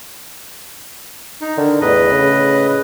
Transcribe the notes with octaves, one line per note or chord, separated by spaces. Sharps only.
D#4
D3 D#3
E2 A2 B4 D#5
C#3